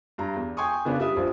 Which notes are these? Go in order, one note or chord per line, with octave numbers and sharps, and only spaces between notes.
G2 A#5
E2
G5 G#5 C6 C#6 D#6
C#3 B3 D4
G3 E5 D#6
A#1 F3